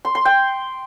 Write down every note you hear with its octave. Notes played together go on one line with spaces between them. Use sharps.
C6
C6
G5